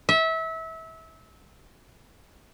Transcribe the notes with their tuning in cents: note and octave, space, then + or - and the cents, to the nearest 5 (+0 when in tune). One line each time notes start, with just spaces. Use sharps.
E5 -25